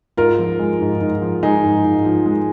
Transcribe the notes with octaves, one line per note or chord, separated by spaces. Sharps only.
G#2 F4 A#4
F3
G#3
G#2
G#2
F3
G#3 D#4 G#4
G#2
G#2
F3
G#3